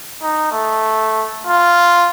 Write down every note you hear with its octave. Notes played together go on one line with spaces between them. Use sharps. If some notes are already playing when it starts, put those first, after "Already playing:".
D#4
A3
F4